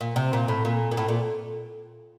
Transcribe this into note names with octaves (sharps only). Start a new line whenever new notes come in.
A#2
C3
A#2
A2
A#2
A#2
A2
A#2